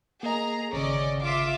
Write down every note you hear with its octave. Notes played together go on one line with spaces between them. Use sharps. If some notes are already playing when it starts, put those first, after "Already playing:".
A#3 G#4 D#5 A#5
G#1 C#3 C#4 D5 D#5
F4 E5 D6